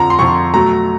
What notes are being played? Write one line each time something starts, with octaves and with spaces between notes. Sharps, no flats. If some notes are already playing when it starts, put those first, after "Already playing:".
Already playing: F2 D3 F3 A#5
C6
F2 D3 F3 C#6
B2 F#3 A3 A#5